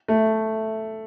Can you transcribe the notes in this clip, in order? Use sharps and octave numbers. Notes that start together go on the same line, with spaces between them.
A3